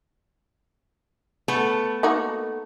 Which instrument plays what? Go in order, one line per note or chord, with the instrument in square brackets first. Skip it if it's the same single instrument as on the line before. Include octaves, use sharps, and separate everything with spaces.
[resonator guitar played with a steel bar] A3 B3 A4
[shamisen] A#3 D#4 F#4